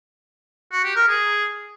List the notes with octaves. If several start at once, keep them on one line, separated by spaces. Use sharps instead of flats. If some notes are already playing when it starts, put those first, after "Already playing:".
F#4
G4
A#4
G#4